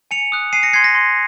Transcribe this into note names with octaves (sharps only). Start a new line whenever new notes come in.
G#5 C#7 F7
D#6 F#6
G#5 C7 D#7
A#6 C#7
C6 F#6 G#6 C7
A#6
C6